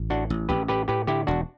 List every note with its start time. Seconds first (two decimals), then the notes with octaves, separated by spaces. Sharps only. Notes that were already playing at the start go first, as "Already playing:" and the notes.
Already playing: A1
0.10 A2 D4 F#4
0.30 A1
0.49 A1 G4 B4
0.68 A2 G4 B4
0.88 A2 G4 B4
1.07 D3 E4 G4
1.27 E1 D4 F#4